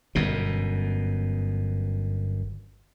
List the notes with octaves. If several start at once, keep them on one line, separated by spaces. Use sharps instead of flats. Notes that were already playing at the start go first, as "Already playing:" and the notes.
G1 F#2 B2